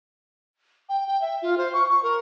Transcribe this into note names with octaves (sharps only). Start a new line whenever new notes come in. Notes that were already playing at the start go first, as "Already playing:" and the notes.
G5
G5
E5
F4
C5
C#6
C#6
A#4